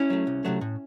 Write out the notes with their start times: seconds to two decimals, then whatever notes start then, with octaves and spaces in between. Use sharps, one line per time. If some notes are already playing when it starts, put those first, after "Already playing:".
Already playing: C#4 E4
0.10 F#3 A3
0.27 C2
0.45 C3 F#3 A3
0.61 A2